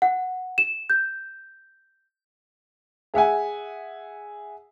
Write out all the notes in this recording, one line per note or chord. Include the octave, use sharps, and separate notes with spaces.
F#5
E7
G6
G#4 E5 F#5 G#5